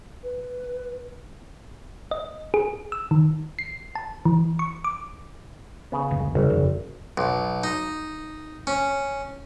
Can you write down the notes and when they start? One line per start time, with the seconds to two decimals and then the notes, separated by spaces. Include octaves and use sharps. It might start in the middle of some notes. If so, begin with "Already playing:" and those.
0.24 B4
2.11 D#5
2.54 G#4
2.92 E6
3.11 D#3
3.59 C7
3.95 A5
4.25 E3
4.59 C#6
4.84 D6
5.92 C#3 B3
6.11 F#1 D2
6.35 G#1 C#3 G3
6.50 G1 F2 C#3
7.18 B1
7.64 D#4
8.67 C#4